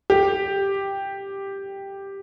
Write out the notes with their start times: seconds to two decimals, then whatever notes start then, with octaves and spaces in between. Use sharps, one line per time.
0.10 G4